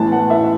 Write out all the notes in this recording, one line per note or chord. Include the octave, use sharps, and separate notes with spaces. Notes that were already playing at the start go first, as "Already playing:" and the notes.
Already playing: A1 A2 E3 B3 A5
F#5
E5